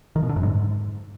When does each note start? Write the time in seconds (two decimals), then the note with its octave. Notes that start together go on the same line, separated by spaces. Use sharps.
0.16 D#3
0.23 B2
0.29 D3
0.36 F#2
0.43 G#2